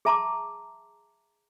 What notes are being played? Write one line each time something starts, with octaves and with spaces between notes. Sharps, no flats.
G#4 E5 A5 A#5 C6 D6